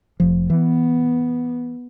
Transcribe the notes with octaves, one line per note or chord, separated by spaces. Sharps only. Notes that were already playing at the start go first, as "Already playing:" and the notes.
F1 F3
E3 B3